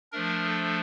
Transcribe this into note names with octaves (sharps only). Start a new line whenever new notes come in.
F3 A3 D4 A#4
A4